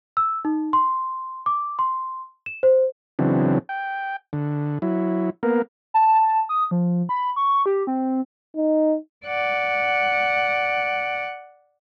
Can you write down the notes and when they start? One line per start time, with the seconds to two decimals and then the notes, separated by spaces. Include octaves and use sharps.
0.17 E6
0.45 D#4
0.73 C6
1.46 D6
1.79 C6
2.46 E7
2.63 C5
3.19 C#3 E3 F#3 C4 D4
3.69 G5
4.33 D3
4.82 F#3 E4
5.43 A#3 B3 A#4
5.94 A5
6.49 D#6
6.71 F3
7.09 B5
7.36 C#6
7.66 G4
7.87 C4
8.56 D#4
9.26 D5 F#5